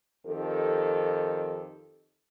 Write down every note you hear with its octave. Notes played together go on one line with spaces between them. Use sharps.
F2 D#3 G4 A4